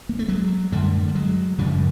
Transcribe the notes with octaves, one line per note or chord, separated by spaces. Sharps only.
A#3
A3
F#3 G#3
F#2 D3 G3 A3
G3
F#3 G#3
F#2 C#3 F3 G3